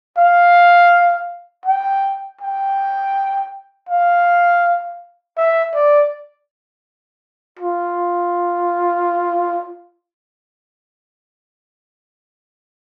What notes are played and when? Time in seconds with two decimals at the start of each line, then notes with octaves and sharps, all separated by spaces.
0.18 F5
1.66 G5
2.41 G5
3.89 F5
5.37 E5
5.74 D5
7.59 F4